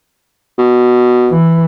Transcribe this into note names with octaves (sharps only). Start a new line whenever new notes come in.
B2
E3